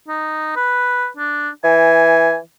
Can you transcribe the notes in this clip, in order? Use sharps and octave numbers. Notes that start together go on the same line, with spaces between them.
D#4
B4
D4
E3 G#5